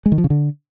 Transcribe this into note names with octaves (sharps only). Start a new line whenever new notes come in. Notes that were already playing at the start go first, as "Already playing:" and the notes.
G#3
D#3
F3
C#3
D3